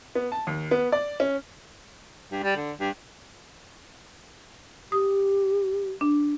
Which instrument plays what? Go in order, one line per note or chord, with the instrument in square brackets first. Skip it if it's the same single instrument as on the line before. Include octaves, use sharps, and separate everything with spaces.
[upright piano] B3
A5
D#2
B3
D5
C#4
[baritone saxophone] G2
G3
D3
G2
[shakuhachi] G4 [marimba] D#6
[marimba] D4